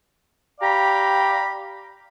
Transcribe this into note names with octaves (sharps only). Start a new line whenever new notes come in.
G4 D5 F5 G5 A#5 B5